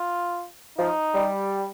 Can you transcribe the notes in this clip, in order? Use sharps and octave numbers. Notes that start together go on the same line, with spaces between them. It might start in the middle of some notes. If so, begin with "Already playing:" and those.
Already playing: F4
F3 D#4
G3